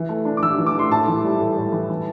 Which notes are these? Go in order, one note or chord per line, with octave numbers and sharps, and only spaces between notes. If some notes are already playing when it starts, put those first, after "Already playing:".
Already playing: E3
A3
D4
D6
E3 E6
E3
D6
A3 C6
A2 A5
E3
G3
A2
A2
E3
E3